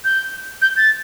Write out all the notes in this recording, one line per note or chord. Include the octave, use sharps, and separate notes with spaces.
G6
G6
A6